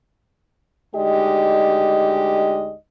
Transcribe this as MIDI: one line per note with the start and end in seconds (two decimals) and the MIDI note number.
0.95 2.74 38
0.95 2.74 56
0.95 2.74 63
0.95 2.74 67
0.95 2.74 74
0.95 2.74 75